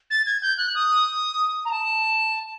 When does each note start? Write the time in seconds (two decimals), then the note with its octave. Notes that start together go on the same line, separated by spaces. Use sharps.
0.10 A6
0.26 G#6
0.42 G6
0.58 F#6
0.75 D#6
1.65 A#5
1.71 A5